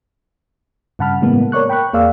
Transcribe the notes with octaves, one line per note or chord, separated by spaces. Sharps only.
G2 C#3 F#5 A5 B5 F6
A2 C#3 E3 G#3 A#3 B3
A#4 C#5 D5 C#6 F#6
G5 B5 C#6 F#6
E2 A#3 G#4 D5 F5 E6